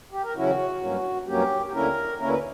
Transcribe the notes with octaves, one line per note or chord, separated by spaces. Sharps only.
G4
A#4
E2 C#3 F#3 C#4 E4 F#4
G2 F#3 A#3 C#4
G2 F#3 A#3 C#4 G4
G4
D2 D3 A#3 C#4 E4 A#4
D2 D3 A#3 C#4 E4 A#4
B4